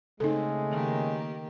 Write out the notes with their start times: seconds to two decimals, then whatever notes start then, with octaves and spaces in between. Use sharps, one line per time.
0.20 C#3 G#3 A3 C4 D#4 A4
0.71 D#3 A#3 G4